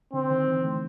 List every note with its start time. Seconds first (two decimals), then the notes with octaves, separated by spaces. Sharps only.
0.13 D3 C4
0.31 D#3
0.48 E3
0.65 A3